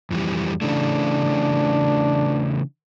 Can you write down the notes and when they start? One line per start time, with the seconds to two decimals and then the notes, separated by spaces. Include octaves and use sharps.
0.11 F2 E3 G3
0.61 C#3 E3 A3 D4